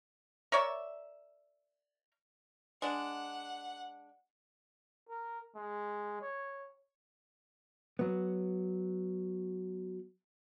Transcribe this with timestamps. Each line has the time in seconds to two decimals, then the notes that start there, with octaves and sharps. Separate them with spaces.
0.52 A#4 C#5 D5 E5
2.82 G#3 D4 F#5
5.09 A#4
5.55 G#3
6.22 C#5
7.99 F#3 B3